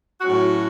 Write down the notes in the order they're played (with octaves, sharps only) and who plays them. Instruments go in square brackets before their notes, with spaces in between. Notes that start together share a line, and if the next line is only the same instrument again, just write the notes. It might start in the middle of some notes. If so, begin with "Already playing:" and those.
[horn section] A2 F#3 C#4 F#4